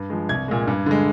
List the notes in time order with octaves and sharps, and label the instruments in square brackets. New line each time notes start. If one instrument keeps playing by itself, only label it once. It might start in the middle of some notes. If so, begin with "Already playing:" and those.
Already playing: [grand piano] G2
F3 G#3
C2 G#6
A#2 G#3
G2
D3 G#3